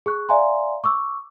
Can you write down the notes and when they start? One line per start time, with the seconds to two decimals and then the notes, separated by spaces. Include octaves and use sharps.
0.06 G#4 C#6 F#6
0.29 D5 E5 F5 G#5 A#5 C6
0.84 C#6 D6 E6